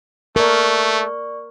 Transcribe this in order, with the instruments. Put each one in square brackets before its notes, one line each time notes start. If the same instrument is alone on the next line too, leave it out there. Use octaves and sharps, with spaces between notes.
[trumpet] A3 [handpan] A#4 [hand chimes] D5 C#6